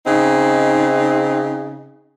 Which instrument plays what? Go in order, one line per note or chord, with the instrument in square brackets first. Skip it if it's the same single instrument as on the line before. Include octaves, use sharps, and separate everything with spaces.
[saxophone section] C#3 C4 D#4